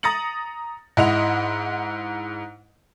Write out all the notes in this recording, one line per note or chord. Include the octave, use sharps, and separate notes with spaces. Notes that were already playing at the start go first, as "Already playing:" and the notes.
A#5 D#6 A6 A#6 C#7 F#7
G#2 E4 D#5 F#5 F7